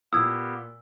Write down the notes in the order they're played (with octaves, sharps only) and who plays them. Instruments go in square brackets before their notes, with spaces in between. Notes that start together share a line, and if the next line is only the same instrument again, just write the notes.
[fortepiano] A#2 [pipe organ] A#3 B3 G4 [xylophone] D#6 G#6 [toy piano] E6